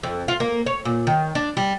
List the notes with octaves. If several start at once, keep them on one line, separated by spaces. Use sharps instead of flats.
F2
F4
A#3
C#5
A#2
D#3
D4
G3